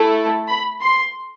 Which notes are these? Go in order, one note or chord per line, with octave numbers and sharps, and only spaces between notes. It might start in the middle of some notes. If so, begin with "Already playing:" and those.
Already playing: A3 E4 A4
B5
C6